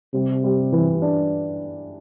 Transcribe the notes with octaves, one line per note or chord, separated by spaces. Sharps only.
C3 G3
G3
E3
D4